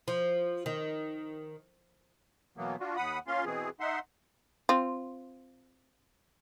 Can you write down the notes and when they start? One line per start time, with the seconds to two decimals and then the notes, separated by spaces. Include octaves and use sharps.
0.08 F3
0.66 D#3
2.57 B2 E3 F#3 A#3 B3
2.80 D4 F4 F#4
2.96 D#2 F#5 B5 D#6
3.27 A#3 C#4 F4 F5 C6
3.45 B2 E3 C4 G#4
3.80 D#4 E5 F#5 C6
4.69 C4 F4